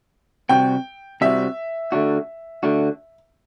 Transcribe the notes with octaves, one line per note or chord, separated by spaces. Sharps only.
C3 G3 C4 F#4 G5
C3 G3 C4 F#4 E5
D3 A3 D4 F#4
D3 A3 D4 F#4